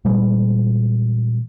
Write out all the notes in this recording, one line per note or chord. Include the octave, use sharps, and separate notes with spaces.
A#2 E3 G3 G#3